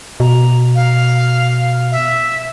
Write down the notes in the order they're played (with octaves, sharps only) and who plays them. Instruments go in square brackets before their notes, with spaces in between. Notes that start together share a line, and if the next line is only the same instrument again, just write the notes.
[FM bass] B2 [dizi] A#5
[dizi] F5
E5